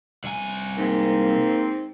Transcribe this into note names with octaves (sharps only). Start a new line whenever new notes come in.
C2 G#5
G#2 A#3 C4